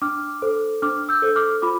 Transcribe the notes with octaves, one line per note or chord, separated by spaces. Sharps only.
D4 D6 F6
A4 C5
D4 D6 F6
E6 G6
A4 C5
D6 F6
F4 B5 D6